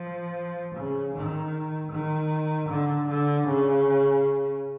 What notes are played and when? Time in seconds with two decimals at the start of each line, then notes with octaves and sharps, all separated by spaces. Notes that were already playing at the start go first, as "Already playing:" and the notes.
Already playing: F3
0.75 C#3
1.14 D#3
1.92 D#3
2.70 D3
3.08 D3
3.47 C#3